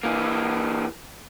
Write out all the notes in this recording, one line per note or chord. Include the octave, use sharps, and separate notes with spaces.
E3 A#3